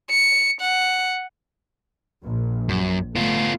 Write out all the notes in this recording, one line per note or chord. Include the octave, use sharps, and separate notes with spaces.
C#7
F#5
A#1
F#2
A3 B3 F4